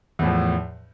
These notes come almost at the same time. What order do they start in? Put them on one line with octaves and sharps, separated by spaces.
E2 A2 F3